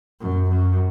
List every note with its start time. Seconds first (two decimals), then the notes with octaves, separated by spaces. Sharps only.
0.21 F#2
0.50 F#2